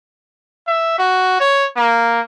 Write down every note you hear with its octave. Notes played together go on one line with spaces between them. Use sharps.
E5
F#4
C#5
A#3